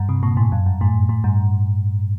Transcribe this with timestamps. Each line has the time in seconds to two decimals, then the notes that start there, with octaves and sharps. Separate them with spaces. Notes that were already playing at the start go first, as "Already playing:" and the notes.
Already playing: G2
0.09 C3
0.23 A#2
0.37 A2
0.52 F#2
0.66 G2
0.81 A2
1.09 A2
1.24 G2